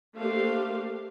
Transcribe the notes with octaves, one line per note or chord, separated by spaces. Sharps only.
A3 A#3 D4 G4 C5 F5